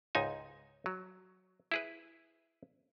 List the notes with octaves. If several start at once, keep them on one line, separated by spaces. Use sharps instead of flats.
C#2 G#2 D#4 G#5
F#3
E4 G#4 B4